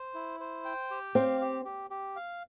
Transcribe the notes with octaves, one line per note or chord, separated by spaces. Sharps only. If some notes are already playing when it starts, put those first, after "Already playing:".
Already playing: C5
E4
C5
G5
G4
C4 F5
G4
G4
G4
F5